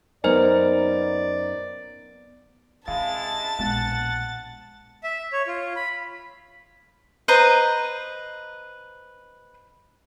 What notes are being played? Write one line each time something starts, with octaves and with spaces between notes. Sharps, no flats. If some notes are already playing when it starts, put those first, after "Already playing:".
F#2 B3 D#4 A#4 C5 D5 D#5 G#5
C3 G#3 E4 F5 A5 A6
A#1 B2 G#3 B3 F#5
E5
C#5
F4
B5
B4 C5 D#5 A#5